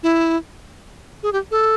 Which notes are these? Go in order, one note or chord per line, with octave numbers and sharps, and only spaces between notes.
E4
G#4
G4
A4